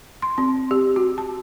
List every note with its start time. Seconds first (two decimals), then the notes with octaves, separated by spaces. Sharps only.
0.22 C6
0.38 C4
0.71 G4
0.96 F#4
1.18 A5